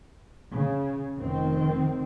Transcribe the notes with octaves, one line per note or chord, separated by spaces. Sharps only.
C#3
F1 D#3 C4